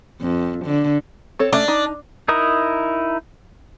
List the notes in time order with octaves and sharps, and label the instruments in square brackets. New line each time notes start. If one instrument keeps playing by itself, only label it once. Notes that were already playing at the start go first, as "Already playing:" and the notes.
[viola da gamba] F2
D3
[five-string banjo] C4 A4 C#5
[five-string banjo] A3 C#4 E5 [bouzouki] D4
[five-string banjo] D#4
[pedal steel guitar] D#4 E4 A#4 D#6